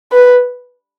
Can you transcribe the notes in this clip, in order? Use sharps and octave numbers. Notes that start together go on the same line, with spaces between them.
B4